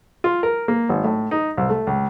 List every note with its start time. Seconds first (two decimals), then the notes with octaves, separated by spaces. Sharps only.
0.24 F4
0.43 A#4
0.68 A#3
0.89 G#1
1.04 A2
1.31 D#4
1.57 C2
1.70 A3
1.87 C#2